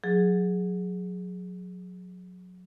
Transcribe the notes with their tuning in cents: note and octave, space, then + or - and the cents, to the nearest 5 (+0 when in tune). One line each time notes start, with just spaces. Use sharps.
F#3 -25 G#4 +0